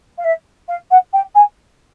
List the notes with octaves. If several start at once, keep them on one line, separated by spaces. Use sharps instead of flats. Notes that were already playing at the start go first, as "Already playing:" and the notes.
F5
E5
F5
F#5
G5
G#5